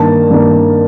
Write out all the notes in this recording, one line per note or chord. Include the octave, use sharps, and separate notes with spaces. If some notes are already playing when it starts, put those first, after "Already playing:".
Already playing: G2 D#3 A#3 A5
G2 D#3 A#3